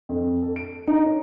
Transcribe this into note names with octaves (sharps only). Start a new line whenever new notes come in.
F2
A4
D7
D#4
C#4